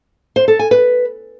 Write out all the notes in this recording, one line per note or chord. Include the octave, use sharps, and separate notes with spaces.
C5
A4
G#5
B4